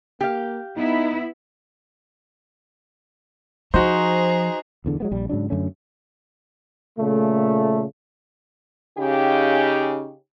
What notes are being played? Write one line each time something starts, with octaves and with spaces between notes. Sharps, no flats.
A#3 G4 F5
B3 D#4 E4
F3 D#4 F#4 G#4 C5 A#5
D1 E2 D3
F#3 G#3 B3
A#1 G3
G#2 C#3 F#3 D4
F#2 D3 A3 C#4
A#2 C#3 A3
C#3 D#4 G4